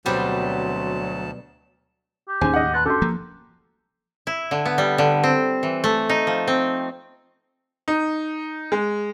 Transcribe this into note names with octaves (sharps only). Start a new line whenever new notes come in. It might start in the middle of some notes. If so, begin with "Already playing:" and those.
D2 B2 F#3 G3 C4 G4 C5 A5
G4
D#2 A2 C#4 D#4 G#4 C5 G#5
D#5 F#5
B4 A5 C6 A6
C#4 D4 F#4 G4 A4 C6
F3 A#3 A#5
E4
D3
B3
G3
D3
C4
E3
A3
D#4
F3
C4
D#4
G#3